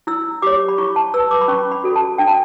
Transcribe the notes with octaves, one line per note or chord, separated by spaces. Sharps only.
E4 E6
G4 C#5 D6
B5
E4 C#6
A5
B4 E6
D6
B5
C#4 C#6
B5
F#4 A4
A5
D4 G5
A5